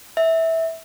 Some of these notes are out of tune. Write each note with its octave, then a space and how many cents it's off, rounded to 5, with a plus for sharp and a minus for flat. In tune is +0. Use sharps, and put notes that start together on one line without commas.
E5 -15